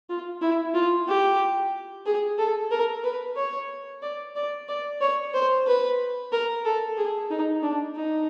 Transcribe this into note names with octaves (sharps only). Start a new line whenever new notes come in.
F4
E4
F4
G4
G#4
A4
A#4
B4
C#5
D5
D5
D5
C#5
C5
B4
A#4
A4
G#4
D#4
D4
D#4